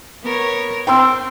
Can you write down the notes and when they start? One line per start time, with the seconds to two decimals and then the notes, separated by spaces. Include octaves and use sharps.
0.23 B3 A#4 C#5
0.87 C4 G5 C6 E6